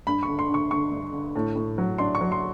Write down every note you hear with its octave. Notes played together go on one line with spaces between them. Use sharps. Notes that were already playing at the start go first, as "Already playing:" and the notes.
G2 B5
C#6
D3
C6
D3 C#6
D3 C#6
G2
D3
A2
A2
F#3
D4 C6
C#6
F#3
C6